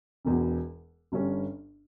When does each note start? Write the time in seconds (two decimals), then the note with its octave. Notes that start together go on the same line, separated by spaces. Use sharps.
0.25 E1 E2 B2
1.12 G1 G2 G3 C#4